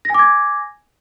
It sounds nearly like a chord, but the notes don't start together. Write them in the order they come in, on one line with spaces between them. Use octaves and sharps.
A#6 G#5 D6 G#6